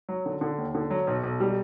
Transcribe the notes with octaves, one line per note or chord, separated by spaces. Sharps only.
F#3
D3
D3
D#2
D3
F#3
B1
B1
G3